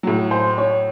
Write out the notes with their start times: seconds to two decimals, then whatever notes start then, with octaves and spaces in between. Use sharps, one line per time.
0.03 A2 F#3
0.31 C5
0.58 C#5